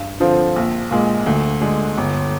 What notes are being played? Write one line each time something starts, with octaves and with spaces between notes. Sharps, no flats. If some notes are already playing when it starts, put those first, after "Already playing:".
Already playing: G2
D3 F3 C4
A#1
A#2 G#3
D2
D3 G#3 D4
G1